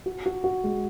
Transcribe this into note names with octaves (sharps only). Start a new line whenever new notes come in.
F#4
F#4
F#4
G#3